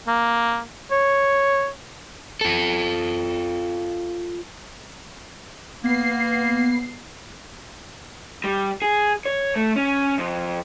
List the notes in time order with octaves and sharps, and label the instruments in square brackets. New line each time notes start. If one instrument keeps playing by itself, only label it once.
[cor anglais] A#3
C#5
[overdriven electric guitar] F4 A4
[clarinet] A#3 [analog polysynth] B3 C7
[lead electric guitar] G3
G#4
C#5
A3
C#4
F2